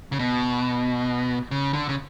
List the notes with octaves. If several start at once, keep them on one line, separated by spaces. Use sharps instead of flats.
C#3
B2
C#3
D3
C#3